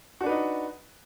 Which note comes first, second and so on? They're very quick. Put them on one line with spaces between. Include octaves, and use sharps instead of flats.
F#4 D4 B4 D#4